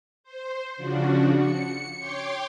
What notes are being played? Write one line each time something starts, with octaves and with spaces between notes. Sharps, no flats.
C5
C#3 F3 D4 F#4
C#7
C#5 G5 C6 D6